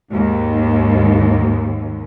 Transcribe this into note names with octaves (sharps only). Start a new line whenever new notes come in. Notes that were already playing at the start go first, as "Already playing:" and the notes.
D#2 G#2